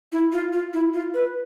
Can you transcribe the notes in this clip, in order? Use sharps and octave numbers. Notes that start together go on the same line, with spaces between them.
E4
F4
F4
E4
F4
B4